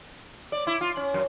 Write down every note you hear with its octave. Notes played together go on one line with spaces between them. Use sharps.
D5
E4
F4
C#4
F#2